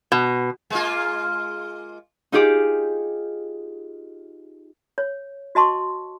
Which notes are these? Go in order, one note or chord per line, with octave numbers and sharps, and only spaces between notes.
B2
G#3 A#3 F4
D#4 F4 G4 G#4 D6
C#5
F#4 D#5 A5 C6 C#6